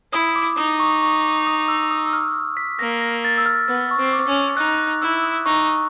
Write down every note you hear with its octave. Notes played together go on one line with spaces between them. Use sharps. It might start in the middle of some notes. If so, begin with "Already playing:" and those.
E4 D#6
D6
D#4 D#6
C#6
C#6
D6
D#6
E6
D#6
E6
F6
B6
A#3 A#6
A#6
A6
E6
F6
B3
C#6
C4
D6
C#4
D#4 F#6
F#6
E4 E6
D#6
D#4 C#6